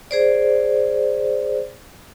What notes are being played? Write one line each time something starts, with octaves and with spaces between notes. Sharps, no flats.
G#4 C5 D5